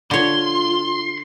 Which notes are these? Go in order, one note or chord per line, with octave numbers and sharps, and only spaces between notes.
D3 F4 C#5 C6